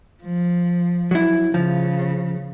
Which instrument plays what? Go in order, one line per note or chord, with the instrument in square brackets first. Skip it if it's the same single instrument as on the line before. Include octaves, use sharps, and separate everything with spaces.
[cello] F3
[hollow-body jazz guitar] F#3 E4
[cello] C#3 [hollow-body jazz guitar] F3